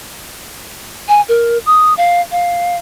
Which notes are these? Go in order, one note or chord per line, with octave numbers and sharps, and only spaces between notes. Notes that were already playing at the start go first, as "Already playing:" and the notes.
G#5
A#4
D#6
F5
F5